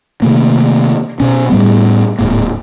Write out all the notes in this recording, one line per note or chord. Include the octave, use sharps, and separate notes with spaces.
C3 D#3 A3 A#3
B2 C#4
A2 G3 B3
D1 G#2 A#3